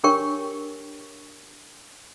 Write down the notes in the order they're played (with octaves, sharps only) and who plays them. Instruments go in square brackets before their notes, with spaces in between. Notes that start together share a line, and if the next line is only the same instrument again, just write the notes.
[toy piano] D4 G4 A#4 C#5 G5 C#6